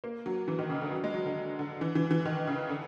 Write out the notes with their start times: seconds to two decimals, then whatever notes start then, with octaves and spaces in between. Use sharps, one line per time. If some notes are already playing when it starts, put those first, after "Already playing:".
0.04 A#3
0.26 F#3
0.48 E3
0.59 D#3
0.70 C#3
0.82 D3
0.91 F#3
1.04 G#3
1.14 F#3
1.26 D3
1.59 D3
1.81 E3
1.95 E3
2.11 E3
2.25 D#3
2.47 C#3
2.69 D3